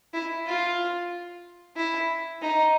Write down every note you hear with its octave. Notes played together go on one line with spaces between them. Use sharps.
E4
F4
E4
D#4